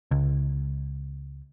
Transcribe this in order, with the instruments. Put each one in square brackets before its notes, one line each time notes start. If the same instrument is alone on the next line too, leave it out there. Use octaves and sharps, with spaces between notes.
[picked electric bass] C#2